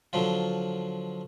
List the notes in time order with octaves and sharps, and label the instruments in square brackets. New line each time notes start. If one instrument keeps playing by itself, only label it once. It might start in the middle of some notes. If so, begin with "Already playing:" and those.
[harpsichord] D3 F3 F#3 F4